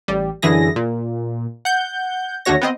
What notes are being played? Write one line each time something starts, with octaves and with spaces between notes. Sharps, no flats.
A1 G3
F#2 D3 E3 E4 G#4 A#6
A#2
F#5 G6
D#2 D3 A3 F#4 C#5 A#6
B3 C4 D#5